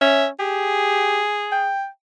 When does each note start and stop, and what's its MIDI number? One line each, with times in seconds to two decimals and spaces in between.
0.01 0.28 61
0.01 0.26 76
0.39 1.22 67
0.39 1.72 68
1.52 1.87 79